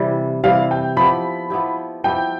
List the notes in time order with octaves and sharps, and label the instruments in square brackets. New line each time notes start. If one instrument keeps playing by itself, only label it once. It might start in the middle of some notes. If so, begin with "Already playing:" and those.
Already playing: [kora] C3 E3 G3
[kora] C3 E3 G3 [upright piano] F5
[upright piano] G5
[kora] F3 B3 E4 G4 [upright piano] B5
[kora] F3 B3 E4 G4
[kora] F3 B3 E4 G4 [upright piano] G5